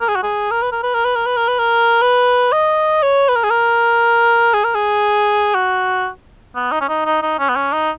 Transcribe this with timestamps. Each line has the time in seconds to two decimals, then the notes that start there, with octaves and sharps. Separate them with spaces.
0.01 A#4
0.08 G#4
0.16 F#4
0.23 G#4
0.51 A#4
0.62 B4
0.72 A#4
0.83 B4
0.94 A#4
1.05 B4
1.16 A#4
1.26 B4
1.37 A#4
1.48 B4
1.59 A#4
2.02 B4
2.52 D#5
3.03 C#5
3.29 B4
3.36 A#4
3.44 G#4
3.50 A#4
4.54 G#4
4.64 A#4
4.74 G#4
5.55 F#4
6.55 B3
6.72 D#4
6.81 C#4
6.89 D#4
7.06 D#4
7.23 D#4
7.39 C#4
7.49 B3
7.56 C#4
7.73 D#4